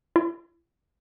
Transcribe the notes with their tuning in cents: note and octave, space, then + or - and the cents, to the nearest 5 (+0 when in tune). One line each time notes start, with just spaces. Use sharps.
E4 +45